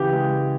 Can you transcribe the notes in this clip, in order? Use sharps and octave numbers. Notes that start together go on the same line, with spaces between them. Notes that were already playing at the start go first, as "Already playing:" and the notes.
Already playing: C#3 E3 G4
G#3